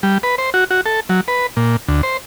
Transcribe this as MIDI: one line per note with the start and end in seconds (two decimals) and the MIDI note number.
0.03 0.18 55
0.23 0.35 71
0.38 0.50 72
0.54 0.64 66
0.71 0.81 66
0.86 1.00 69
1.09 1.21 54
1.28 1.47 71
1.57 1.76 46
1.88 2.02 38
2.03 2.17 72